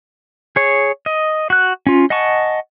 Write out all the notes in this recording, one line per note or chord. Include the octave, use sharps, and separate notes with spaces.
G#4 C#5
D#5
F#4 F#6
C#4 F4
D#5 F#5 G#5 A5 C#6